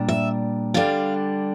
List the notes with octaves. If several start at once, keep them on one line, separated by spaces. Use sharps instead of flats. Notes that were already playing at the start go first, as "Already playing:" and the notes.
Already playing: A#2 G3 D4
E5
D3 G3 D4 F5